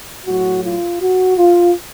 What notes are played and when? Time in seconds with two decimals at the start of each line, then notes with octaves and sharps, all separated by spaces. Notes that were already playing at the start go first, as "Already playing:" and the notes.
0.25 A2 F#3 F#4
0.63 F4
1.00 F#4
1.37 F4